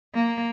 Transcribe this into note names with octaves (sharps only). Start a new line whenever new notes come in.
A#3